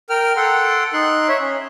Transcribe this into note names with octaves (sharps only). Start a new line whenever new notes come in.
A#4 G5 F6
A4 F#5 G5 C6
D#4 C6 F#6
C#5 E5
C#4